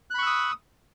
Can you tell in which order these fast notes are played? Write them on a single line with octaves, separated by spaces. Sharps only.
F#6 B5 C#6 E6 D#6